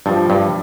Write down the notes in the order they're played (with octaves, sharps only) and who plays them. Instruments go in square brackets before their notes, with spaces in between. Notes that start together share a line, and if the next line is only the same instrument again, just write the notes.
[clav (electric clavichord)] G2 [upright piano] F3
[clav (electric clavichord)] G2